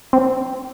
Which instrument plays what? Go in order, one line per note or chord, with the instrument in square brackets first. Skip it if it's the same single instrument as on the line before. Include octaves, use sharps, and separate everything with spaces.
[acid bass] C4